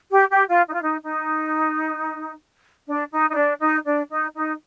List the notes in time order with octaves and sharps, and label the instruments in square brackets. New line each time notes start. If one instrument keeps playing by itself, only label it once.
[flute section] G4
G4
F4
D#4
F4
D#4
D#4
D4
D#4
D#4
D4
D#4
D4
D#4
D#4